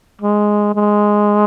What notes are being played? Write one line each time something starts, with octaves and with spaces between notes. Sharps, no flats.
G#3
G#3